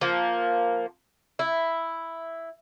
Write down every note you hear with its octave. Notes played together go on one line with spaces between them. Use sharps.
F3 A#3
E4